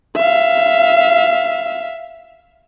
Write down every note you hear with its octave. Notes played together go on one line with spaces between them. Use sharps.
E5 F5